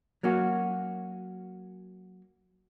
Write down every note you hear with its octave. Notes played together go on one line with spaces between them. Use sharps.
F#3 A#3 C#4 F#4